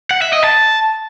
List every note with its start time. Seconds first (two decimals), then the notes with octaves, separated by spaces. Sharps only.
0.11 F#5
0.22 E5
0.33 D#5
0.44 A5